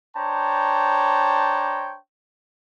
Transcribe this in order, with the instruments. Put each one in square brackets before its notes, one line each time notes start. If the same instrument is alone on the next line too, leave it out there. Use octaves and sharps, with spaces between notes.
[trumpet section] D4 C5 C#5 G5 A5 A#5